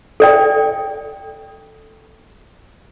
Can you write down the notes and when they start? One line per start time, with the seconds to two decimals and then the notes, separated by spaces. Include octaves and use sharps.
0.20 A4 D5 G5